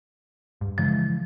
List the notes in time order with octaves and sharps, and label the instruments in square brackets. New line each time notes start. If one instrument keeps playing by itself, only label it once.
[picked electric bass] G2
[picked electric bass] C#3 E3 G#3 [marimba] F3